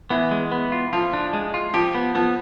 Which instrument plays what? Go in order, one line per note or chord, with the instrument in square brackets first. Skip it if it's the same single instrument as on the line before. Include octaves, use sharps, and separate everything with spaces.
[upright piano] E3 [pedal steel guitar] B3
[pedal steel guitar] G#3
B3
F4
[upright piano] F3 [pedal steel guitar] F4
[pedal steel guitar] D4
G#3
F4
[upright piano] F3 [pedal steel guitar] G4
[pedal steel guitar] B3
[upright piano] F3 [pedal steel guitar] B3